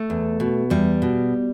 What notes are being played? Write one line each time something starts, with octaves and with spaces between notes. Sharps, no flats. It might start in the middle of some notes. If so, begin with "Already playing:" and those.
Already playing: A3
E2
B2
E2 G3
B2